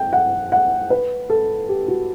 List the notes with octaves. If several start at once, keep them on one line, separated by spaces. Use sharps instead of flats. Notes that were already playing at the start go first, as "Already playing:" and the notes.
Already playing: G5
F#5
F#5
B4
A4
G4
F#4